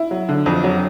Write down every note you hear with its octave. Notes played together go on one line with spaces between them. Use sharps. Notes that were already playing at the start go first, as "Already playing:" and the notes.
Already playing: E4
F#3
D3
F2
F#3